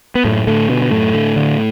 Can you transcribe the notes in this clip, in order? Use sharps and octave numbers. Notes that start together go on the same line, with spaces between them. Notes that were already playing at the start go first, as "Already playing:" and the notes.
B3
F#2 A2 A3
A2 D3 A3
B2 D3 B3
B3
F#2 A2 A3
D3
D3